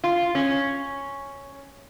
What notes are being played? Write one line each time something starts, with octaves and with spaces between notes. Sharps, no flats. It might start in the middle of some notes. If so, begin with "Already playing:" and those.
F4
C#4